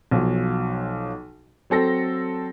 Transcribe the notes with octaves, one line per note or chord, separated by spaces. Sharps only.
B1 F3 F#3
F#3 C4 A4 A#6